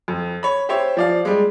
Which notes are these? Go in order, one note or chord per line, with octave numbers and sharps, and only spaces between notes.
F2
C#5 B5
G4 C5 C#5 E5
F3 D5 F5
G3 G#3